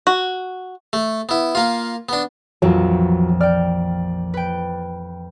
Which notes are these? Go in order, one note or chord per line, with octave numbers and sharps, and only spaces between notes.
F#4
A3
B3 E4
A#3 F4
B3 D4
A#1 F2 E3 F#3 F4
D5 G5 F6
B4 G5